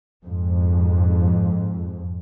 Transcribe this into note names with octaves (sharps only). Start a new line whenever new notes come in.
F2 G#2